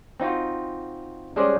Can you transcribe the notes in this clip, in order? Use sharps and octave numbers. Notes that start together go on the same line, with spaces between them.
C4 D#4 F4 F#4
G3 G#3 C#4 G#4 C5 D5